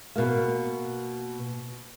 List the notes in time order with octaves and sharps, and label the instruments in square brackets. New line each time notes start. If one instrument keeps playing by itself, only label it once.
[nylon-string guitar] B2 A#3